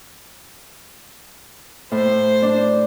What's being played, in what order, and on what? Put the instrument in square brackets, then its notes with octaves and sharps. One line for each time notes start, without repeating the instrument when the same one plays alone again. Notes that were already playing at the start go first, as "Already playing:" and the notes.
[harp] A2 [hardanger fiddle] C5
[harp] D4